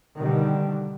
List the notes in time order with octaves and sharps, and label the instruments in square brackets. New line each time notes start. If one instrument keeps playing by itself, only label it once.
[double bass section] B2 D3 D#3 G3